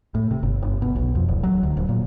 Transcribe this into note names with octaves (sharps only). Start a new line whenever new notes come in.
A2
C3
G1
G1
B2
B1
F2
D1
F#3
D2
D1
A#2